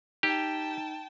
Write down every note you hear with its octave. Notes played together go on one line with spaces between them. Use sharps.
D#4 G4 G5 A5